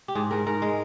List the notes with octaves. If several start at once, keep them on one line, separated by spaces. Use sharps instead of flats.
G4
G#2 G#4
G#2 A#4
G#2 A#4
G#3